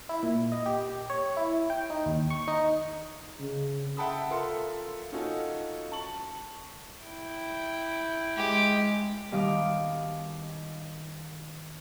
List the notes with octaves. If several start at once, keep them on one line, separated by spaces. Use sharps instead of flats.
E4
A#2
D#5
G4
C#5
E4
G5
D#4
D#2
C#6
D#4
C#3
E5 F#5 G5 A5 B5 D#6
F4 A4 A#4 E5 C6
C#4 D#4 F4 F#4 A4
A5 C#6 F#7
E4 G5
G#3 G4
B2 D#3 G3 D#5 F5 D6